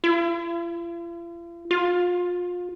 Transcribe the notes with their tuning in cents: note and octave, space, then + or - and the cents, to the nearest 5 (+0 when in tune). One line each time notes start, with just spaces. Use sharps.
F4 -45
F4 +30